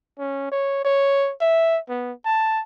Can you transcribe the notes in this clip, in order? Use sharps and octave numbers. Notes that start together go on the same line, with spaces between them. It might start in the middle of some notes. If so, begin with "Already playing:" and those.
C#4
C#5
C#5
E5
B3
A5